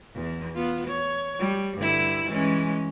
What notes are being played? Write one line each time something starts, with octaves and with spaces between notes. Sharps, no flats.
E2
B3 F4
C#5
G3
G2 D3 E4
E3 G#3 C#4